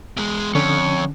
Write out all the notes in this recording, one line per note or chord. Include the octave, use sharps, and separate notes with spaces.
E2 G#3
F2 D3 C#4 C#5